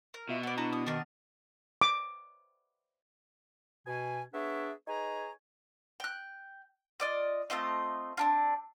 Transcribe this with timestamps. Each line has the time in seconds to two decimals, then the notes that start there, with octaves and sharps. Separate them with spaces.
0.14 A#4
0.29 B2 F4 E5
0.43 B3 A4 D5
0.57 D4 E4 F#4 A5 A#5
0.73 D#6
0.86 D#3 B3 D4 A#4 D#5
1.81 D6
3.87 B2 G#5
4.34 B3 D4 G#4 C#5 E5
4.88 D#4 G#4 B4 C#5 G#5 A#5
6.00 G5 F#6
7.00 F4 D5 D#5
7.50 A3 C4 F4 D#5
8.17 C4 D4 F4